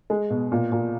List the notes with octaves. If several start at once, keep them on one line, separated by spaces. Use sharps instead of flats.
G#3
B2
A#2
A#2